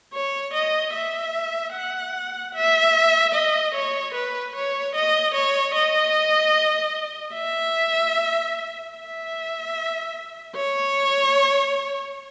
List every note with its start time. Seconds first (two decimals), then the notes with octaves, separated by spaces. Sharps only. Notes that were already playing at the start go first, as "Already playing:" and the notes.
0.13 C#5
0.53 D#5
0.93 E5
1.73 F#5
2.54 E5
3.34 D#5
3.74 C#5
4.14 B4
4.55 C#5
4.95 D#5
5.34 C#5
5.74 D#5
7.34 E5
8.95 E5
10.55 C#5